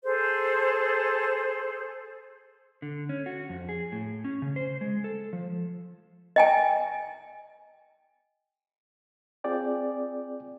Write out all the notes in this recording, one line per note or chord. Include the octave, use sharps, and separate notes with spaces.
G#4 A4 C5
D3
C#4
F#4
F2
G#4
A2
C#4
C#3
C5
G#3
A4
F3
D#5 G5 G#5
C4 F4 G#4 D5 G5